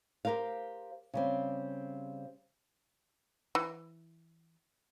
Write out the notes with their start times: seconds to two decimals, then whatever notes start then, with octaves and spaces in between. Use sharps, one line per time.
0.25 G4 G#4 A#4 C5 F5
1.14 C#3 G3 C4
3.55 E3